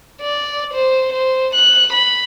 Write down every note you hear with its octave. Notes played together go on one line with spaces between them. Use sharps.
D5
C5
C5
F#6
B5